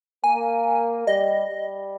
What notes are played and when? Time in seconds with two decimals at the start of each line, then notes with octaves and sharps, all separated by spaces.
0.24 A#3 G#5
1.07 G3 D#5
1.48 G3